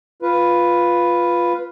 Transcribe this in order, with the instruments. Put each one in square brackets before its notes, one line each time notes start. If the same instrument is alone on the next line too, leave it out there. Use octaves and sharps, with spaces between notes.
[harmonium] F4 B4